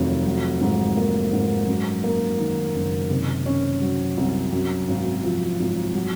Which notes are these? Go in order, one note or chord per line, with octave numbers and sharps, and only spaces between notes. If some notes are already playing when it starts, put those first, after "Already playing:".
Already playing: F1 D#2 D#3 F#3
F#3
G#2
A#3
G#2
F#2
A#3
D#3
F#1
C3
C#4
F#3
C2
F#2
G#1
F3
G#1
F#3